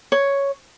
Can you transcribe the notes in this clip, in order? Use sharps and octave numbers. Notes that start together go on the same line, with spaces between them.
C#5